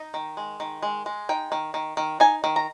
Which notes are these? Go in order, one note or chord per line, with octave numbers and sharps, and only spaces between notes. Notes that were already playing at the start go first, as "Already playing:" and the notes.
Already playing: D#4
D#3
G#3
D#3
G#3
G#3
D#4 G5
D#3
D#3
D#3
D#4 G#5
D#3
A#5